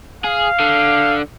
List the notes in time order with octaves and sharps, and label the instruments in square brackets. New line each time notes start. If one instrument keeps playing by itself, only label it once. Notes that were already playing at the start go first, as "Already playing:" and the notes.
[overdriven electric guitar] G#4 [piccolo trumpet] F5
[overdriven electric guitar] D3